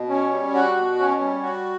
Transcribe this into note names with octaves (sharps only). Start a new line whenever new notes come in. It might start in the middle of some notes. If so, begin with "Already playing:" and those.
Already playing: B2
C#4
G3
F#4
B2
C#4
G3
F#4